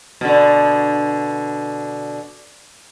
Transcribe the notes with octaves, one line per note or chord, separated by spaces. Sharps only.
B2 D3